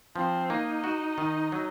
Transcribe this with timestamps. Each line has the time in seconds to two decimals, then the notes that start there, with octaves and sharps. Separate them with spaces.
0.16 F3 C4
0.50 A#3 D#4
0.84 F#4
1.18 D#3
1.52 F#3